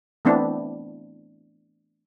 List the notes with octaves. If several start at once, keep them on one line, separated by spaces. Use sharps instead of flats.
E3 A3 B3 C4 D4 E4